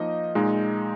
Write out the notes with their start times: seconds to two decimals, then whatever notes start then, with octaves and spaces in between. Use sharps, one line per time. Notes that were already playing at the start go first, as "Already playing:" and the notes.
Already playing: F3 A#3 D#4 D#5
0.35 A#2 G#3 D#4